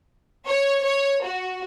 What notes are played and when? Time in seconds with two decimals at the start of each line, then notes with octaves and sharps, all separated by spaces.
0.45 C#5
0.84 C#5
1.23 F#4